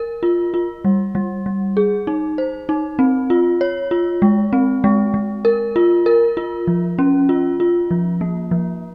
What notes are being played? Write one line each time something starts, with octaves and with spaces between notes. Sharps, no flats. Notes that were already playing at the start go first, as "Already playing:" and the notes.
Already playing: A#4
F4
F4
G3
G3
G3
G#4
D#4
C5
D#4
C4
F4
C#5
F4
G#3
C4
G#3
G#3
A#4
F4
A#4
F4
F3
C#4
F4
F4
F3
A#3
F3